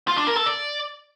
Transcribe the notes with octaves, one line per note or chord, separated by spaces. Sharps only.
F4
D4
A#4
A4
D5